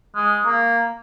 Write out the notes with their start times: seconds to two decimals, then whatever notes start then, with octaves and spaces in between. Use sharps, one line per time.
0.15 G#3
0.46 A#3